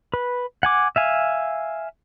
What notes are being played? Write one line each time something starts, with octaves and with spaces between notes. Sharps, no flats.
B4
F#5 G#5 D6
E5 F5 G#5